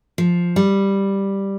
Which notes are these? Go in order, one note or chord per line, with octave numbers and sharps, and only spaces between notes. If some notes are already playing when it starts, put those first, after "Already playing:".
F3
G3